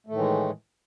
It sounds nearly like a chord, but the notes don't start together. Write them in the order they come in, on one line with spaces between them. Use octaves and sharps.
A3 A2 D#3 E3 G#3